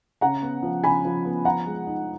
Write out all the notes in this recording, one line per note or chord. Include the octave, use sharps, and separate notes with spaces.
C#3 F#5 A#5
B3
F3
C#3 G#5 B5
F3
B3
F3 F#5 A#5
G#3
D#4